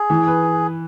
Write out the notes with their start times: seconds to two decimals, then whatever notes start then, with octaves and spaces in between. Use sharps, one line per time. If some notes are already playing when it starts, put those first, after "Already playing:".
Already playing: G#4
0.10 E3
0.27 B4